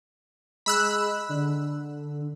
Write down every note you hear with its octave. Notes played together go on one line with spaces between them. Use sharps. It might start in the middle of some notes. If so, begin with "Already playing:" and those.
G#3 B5 E6 F#6
D3